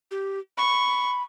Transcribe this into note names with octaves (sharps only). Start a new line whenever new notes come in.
G4
B5 C#6